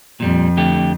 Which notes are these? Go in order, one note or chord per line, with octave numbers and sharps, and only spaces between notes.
F2 A#2 G3
D3 A3 G4